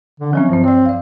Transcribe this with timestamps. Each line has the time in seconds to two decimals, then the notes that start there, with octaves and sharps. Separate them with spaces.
0.20 D3
0.33 F3 F#3 C4 C#4
0.49 G2 F3 C4
0.64 C4 C#5 D5
0.86 D5 F5